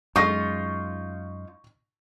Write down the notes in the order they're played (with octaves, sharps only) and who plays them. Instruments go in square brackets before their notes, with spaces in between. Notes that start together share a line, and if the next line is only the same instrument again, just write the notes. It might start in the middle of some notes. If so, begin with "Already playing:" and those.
[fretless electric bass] F#2 G#3 [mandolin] D#4 F4 [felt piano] C#6 A#6